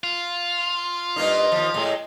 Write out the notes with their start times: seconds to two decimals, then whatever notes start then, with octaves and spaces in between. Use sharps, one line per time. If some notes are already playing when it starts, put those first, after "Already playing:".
0.04 F4
1.16 G2 A#3 D#4
1.52 D#2 F3
1.74 A2 G#3